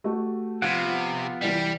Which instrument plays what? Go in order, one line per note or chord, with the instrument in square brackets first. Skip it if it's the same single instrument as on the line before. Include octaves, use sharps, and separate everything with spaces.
[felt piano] A3 F#4 G4
[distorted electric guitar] C3 [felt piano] F3 G#6 B6 [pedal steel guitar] B3 F4 F#5
[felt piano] F3 B6
[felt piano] C2 E3 D5 [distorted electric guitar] G3